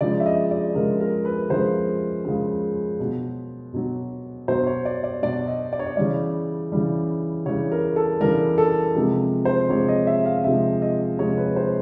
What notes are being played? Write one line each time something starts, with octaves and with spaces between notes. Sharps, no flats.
C#3 F3 G#3 D5
E5
D#5
D5
C#3 F3 G#3 A#4
A#4
B4
C#3 F3 G#3 C5
C#3 F3 G#3
B2 F#3
B2 F#3
B2 F#3 C5
C#5
D5
D5
B2 F#3 D5
D#5
D5
C#5
D5
C#3 E3 G3 D5
C#3 E3 G3
C#3 E3 G3 C#5
A#4
A4
C#3 E3 G3 A#4
A4
C3 F3 G#3
C5
C3 F3 G#3 C#5
D#5
E5
F5
C3 F3 G#3 E5
D#5
C3 F3 G#3 C#5
B4
C5